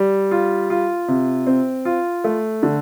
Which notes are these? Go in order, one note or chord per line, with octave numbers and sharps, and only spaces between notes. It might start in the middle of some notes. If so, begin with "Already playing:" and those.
Already playing: G3
F4
F4
C3
C4
F4
A3
D3